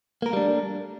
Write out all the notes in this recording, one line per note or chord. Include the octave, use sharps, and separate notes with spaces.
G3 A3 A#3 D4 A#4